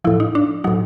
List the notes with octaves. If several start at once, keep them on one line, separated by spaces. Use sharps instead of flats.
A2 F3 E4
D#4
D4
A2 F#3 D#4